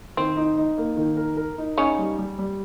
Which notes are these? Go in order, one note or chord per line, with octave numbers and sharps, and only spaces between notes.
D#3 C4
D#4
D#4
A#3
D#3
A#4
A#4
D#4
C#3 C#4 D#4
G3
G3
G3